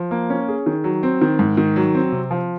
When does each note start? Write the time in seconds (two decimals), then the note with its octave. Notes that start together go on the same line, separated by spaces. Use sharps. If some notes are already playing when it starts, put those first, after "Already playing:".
Already playing: F3
0.11 A#3
0.30 C#4
0.48 G#4
0.66 D#3
0.84 F#3
1.03 C4
1.21 D#3
1.39 G#2
1.57 D#3
1.76 F#3
1.95 C4
2.12 C3
2.31 F3